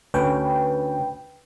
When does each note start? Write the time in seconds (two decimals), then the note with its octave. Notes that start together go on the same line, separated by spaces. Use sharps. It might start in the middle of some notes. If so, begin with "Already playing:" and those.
0.14 D2 C#4 B4 G5